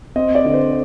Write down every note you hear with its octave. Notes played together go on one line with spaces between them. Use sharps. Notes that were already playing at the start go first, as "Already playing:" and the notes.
C4 D#5
D5
D3
C5